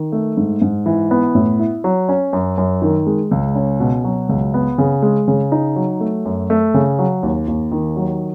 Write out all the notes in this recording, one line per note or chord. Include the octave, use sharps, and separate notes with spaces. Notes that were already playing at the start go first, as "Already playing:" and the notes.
Already playing: D#3
A3
G#2
G#2
E3
B3
A2
E4
F#3
C#4
F#2
F#2
D#3
G#3
C#2
C#4
B2
F#3
C#2
B3
C#3
G#3
C#3
D#4
F#3
A3
F#2
A3
C#3
F#3
D#2
D#2
D#3
F#3